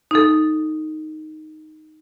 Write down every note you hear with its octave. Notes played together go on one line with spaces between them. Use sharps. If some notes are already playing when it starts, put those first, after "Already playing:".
D#4 A4